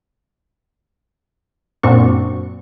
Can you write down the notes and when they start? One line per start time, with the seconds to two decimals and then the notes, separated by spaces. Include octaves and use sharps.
1.83 F#2 A#2 C4 D4 F#4 C#6